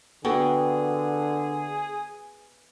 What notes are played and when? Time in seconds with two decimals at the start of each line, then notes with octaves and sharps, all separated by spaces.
0.25 D3 B3 F#4 G#4 A4 G5